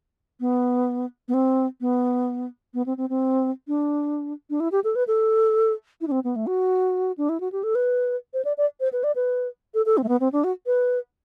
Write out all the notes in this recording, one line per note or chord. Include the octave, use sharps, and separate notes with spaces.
B3
B3
C4
B3
B3
C4
C4
C4
D4
D4
E4
G4
A4
B4
A4
E4
D4
C4
B3
A3
F#4
D4
E4
F#4
G4
A4
B4
C5
D5
D5
C5
B4
D5
B4
A4
A4
C4
A3
B3
C4
D4
F#4
B4